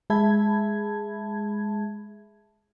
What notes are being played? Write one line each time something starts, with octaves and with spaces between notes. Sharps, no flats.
G#3 G#4 E5 A5 B5 G#6